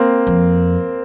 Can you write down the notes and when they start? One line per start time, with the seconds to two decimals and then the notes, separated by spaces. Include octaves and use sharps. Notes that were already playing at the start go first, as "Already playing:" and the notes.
Already playing: A#3 C4
0.27 F2